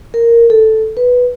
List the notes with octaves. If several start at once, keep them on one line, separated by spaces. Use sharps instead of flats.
A#4
A4
B4